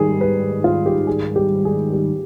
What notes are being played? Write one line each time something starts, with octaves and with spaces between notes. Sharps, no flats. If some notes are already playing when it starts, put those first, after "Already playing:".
Already playing: G#2 D#3 G3 G#4
B4
F4
G4
G#4
G4
G#4
G4